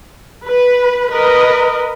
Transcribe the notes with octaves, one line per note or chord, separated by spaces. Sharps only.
B4
A#4 B4 D#5